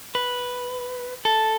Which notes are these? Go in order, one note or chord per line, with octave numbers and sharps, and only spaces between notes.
B4
A4